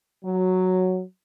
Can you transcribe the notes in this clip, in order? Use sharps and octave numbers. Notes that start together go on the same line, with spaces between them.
F#3